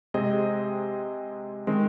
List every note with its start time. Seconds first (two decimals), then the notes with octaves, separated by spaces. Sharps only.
0.14 C3 G#3 C4 G#4 D#5
1.67 D#3 G#3 C4